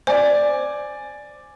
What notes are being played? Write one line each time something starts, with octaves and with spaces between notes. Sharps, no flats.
C5 D5 G#5